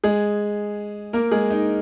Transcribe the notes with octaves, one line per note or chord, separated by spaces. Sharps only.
G#3 G#4
A#3 A#4
G#3 G#4
D#4